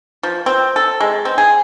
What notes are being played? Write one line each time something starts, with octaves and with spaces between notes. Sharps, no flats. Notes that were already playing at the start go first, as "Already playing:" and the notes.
F3
C4
A4
G#3
C4
G#4